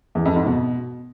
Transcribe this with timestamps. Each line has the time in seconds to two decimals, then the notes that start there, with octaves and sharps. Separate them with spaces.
0.15 E2
0.25 F2
0.36 G#2
0.46 B2